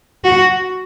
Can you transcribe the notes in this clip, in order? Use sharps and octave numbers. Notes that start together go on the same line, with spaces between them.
F#4